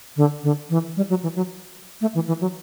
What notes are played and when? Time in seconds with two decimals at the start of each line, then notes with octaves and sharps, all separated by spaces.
0.17 D3
0.43 D3
0.70 E3
0.97 G3
1.10 F#3
1.23 E3
1.36 F#3
2.01 A3
2.15 E3
2.28 E3
2.41 F#3